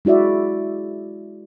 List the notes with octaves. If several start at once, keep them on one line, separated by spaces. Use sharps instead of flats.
G#3 E4 F#4 D5 E5